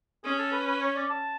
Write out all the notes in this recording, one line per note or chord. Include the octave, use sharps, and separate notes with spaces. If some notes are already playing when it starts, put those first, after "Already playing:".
C#4 G#4
A4
B4
B4
C#5
D5
A5